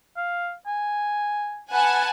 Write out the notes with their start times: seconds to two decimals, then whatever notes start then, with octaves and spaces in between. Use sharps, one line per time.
0.17 F5
0.67 G#5
1.72 B4 F#5 G#5 A5